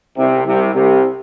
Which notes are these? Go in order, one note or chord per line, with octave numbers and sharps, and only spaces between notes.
C2 C3
C2 C3
C2 C3